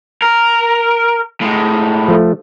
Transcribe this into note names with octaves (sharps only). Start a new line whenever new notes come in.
A#4
A2 G#3
F3 A3